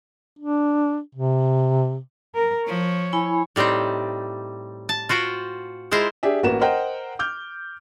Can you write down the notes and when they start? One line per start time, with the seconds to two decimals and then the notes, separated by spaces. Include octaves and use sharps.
0.39 D4
1.15 C3
2.35 A#4
2.67 F3 C#5
3.13 E4 G#5 B5
3.56 A2 G3 C4 D#4 C5
4.89 A5
5.09 F4 F#4 C5 G5
5.91 G#3 E4 F4 A#4 C5
6.23 D4 G4 G#4 E5
6.43 A1 A#3 F#4 B4 E7
6.61 A#4 C5 D#5 F#5 G5
7.19 D6 F6 G6